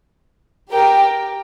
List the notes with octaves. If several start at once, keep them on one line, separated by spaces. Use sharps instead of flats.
G4 A#4 G5